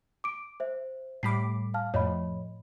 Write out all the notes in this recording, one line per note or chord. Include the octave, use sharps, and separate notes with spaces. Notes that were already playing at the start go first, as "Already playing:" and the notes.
D6 D7
C5 E5
A2 G3 B5 D6 B6 C7
F5 A5 F6
F2 A2 F3 C#5 D#5 B5